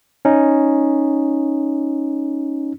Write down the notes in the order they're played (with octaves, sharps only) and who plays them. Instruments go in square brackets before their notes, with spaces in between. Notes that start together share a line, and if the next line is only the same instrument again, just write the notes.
[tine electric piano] C#4 D#4